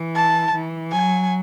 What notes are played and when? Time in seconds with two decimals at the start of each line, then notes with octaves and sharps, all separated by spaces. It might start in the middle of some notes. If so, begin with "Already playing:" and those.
Already playing: E3
0.15 A5
0.54 E3
0.92 F#3 G#5